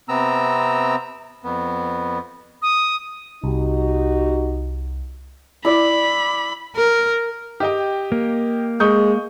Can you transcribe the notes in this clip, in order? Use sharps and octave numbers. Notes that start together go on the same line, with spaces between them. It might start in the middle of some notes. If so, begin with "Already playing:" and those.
C3 B3 C4 A#5 E6
F2 B3
D#6
C2 D#4 F#4 G4
E4 D5 B5
A#4
G4 D#5 G5
A#3
G#3 C#6 D#6 G6